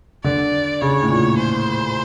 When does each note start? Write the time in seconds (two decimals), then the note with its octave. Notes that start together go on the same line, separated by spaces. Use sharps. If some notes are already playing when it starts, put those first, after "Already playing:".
0.24 D3 D5
0.81 C#3 C#5
1.03 A2
1.10 A#2
1.38 C5